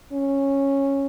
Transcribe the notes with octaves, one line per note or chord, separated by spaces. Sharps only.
C#4